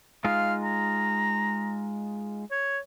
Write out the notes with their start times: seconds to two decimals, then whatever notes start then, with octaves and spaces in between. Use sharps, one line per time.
0.25 G#3 D#4 F4 F5
0.64 A#5
2.51 C#5